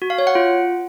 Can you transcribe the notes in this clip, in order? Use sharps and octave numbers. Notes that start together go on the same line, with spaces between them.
F#4
F5
C#5
F#5
F4